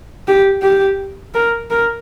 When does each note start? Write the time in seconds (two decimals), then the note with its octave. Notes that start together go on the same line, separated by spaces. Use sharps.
0.28 G4
0.62 G4
1.35 A#4
1.70 A#4